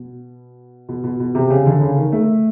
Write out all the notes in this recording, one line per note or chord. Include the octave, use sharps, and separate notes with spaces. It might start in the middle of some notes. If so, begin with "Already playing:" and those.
Already playing: B2
B2
B2
B2
C3
C#3
D3
C#3
D#3
A3